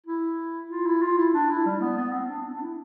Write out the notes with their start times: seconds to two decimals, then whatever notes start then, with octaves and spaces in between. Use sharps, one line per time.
0.07 E4
0.70 F4
0.86 E4
1.02 F4
1.18 E4
1.34 D4
1.50 E4
1.66 G3
1.81 B3
1.97 B3
2.13 C4
2.29 D4
2.47 C4
2.54 D4
2.61 E4